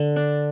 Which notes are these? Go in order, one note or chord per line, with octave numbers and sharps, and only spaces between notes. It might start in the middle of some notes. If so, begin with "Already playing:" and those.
Already playing: D3
D4